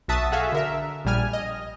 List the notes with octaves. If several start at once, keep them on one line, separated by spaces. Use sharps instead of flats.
B1 F#4 E5 A5 D#6
F#4 G#4 A4 E5 F5
D3 A#4 E5
A#1 A#2 G3 G#5 F6
D#5